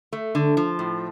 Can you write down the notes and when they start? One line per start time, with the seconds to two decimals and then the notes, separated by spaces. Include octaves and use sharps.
0.13 A3
0.35 D3
0.57 F3
0.79 A2